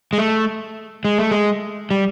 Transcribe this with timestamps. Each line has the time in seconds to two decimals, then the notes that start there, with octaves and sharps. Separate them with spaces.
0.13 G#3
0.18 A3
1.05 G#3
1.19 A3
1.31 G#3
1.91 G3